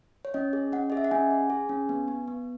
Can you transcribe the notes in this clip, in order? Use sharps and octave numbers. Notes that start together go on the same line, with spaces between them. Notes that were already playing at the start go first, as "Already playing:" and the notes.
C#5
C#4 D#5
G#4
C#4 F#5
G#4 D#5
E5
F#5
C#4 G#5
G#4
G#4
C#4
B3
B3
B3